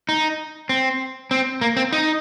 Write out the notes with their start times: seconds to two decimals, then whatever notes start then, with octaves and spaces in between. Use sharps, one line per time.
0.09 D#4
0.69 C4
1.31 C4
1.61 A#3
1.77 C4
1.93 D#4